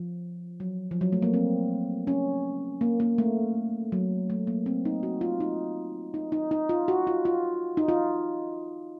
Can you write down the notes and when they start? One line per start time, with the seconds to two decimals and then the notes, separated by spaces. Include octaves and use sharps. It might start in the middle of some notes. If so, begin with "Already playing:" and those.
Already playing: F3
0.60 F#3
0.91 F3
1.01 F#3
1.12 A3
1.22 A#3
1.34 C4
2.07 C#4
2.81 A#3
3.00 A#3
3.18 A3
3.92 F#3
4.30 A3
4.47 A#3
4.66 C4
4.85 D#4
5.03 F#4
5.21 F4
5.40 D#4
6.14 D#4
6.32 D#4
6.51 D#4
6.69 F4
6.88 F#4
7.07 F4
7.25 F4
7.77 D#4
7.88 F4